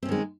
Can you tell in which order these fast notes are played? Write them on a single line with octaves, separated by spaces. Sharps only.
C4 C#4 D#3 G#3